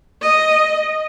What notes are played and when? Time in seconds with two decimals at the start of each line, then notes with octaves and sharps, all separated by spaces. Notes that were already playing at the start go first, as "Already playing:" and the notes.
0.22 D#5